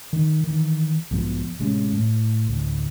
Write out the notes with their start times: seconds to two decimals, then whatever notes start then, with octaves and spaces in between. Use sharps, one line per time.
0.13 D#3
0.44 D#3 E3
1.11 B1 G#2 F3 B3
1.59 A1 C3 G#3 C#4
1.93 A2
2.47 A1 D2